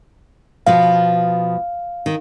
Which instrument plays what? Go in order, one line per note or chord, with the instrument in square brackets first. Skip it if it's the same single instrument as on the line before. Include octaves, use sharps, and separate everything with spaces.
[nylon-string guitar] B2 F3 B3 [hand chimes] F5
[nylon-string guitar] D#3